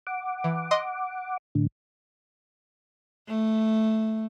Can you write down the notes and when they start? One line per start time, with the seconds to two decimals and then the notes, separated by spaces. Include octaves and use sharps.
0.07 F#5 D6
0.44 E3
0.71 D#5 C6
1.55 A2 D3
3.28 A3